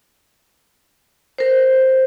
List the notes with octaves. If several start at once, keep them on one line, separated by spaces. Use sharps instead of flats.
A#4 C5